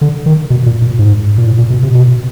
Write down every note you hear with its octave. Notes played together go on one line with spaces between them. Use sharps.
D3
D#3
B2
A#2
A#2
G#2
A#2
A2
A#2
B2
C3
B2